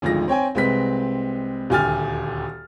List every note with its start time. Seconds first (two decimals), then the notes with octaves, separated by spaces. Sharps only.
0.02 G#1 D2 F3 G#3 A#6
0.28 C4 C#5 G5 G#5
0.55 C2 G#3 C4 B4 B6
1.70 D#1 D2 G4 G#5 F6 A6